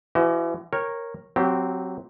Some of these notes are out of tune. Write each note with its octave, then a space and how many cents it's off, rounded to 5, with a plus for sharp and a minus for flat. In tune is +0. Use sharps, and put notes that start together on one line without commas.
E3 +35 F#4 +40 D#5 +0
A#4 +0 C#5 -15 G5 +0
F#3 +0 C4 +0 G4 -20